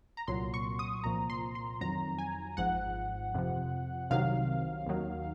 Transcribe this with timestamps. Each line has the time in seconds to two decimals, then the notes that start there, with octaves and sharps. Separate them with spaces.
0.17 A#5
0.28 C2 A#2 F#3 C6
0.54 C#6
0.79 D#6
1.04 C2 A#2 F3 A#5
1.30 C6
1.55 C6
1.81 F2 D#3 F#3 A#5
2.18 G#5
2.57 G#1 G#2 F3 F#5
3.34 F2 C3 F3
4.10 C2 C3 D#3 F#3 F5
4.86 D#2 D#3 F#3